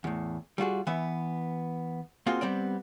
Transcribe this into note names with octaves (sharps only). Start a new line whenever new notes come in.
E2 A2
G3 F4 F#4 G#4
E3 B3 E5
A#3 C4 F4 F#4 G#4
G3 B3 C4 D5